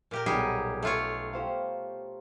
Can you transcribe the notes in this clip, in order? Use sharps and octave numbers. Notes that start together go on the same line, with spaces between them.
A#2 G4 A#4
B1 G3 G4 G#4 A#5
A3 F4 C#5
G4 C5 F5